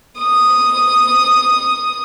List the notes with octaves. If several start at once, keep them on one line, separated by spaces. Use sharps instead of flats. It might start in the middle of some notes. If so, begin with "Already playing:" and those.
D#6